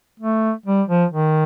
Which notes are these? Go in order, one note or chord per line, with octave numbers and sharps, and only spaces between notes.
A3
G3
F3
D#3